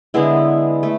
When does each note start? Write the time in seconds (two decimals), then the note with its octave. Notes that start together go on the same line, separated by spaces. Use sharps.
0.14 D3 G#3 B3 E4
0.83 A3